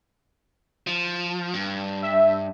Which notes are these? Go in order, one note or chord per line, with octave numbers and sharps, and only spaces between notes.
F3
G2
E5